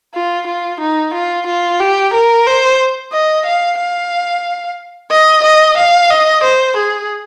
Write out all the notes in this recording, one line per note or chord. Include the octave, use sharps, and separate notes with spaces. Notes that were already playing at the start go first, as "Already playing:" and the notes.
F4
F4
D#4
F4
F4
G4
A#4
C5
D#5
F5
F5
D#5
D#5
F5
D#5
C5
G#4